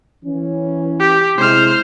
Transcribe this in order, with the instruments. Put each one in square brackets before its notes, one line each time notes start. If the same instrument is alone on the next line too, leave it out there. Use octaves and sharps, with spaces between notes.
[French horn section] E3 C#4
[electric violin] G4
[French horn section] C3 G#3 E4 [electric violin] C5 F6